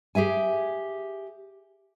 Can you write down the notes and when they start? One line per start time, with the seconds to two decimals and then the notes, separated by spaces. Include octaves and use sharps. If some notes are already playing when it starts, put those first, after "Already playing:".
0.15 G4 G#4 E5 G#5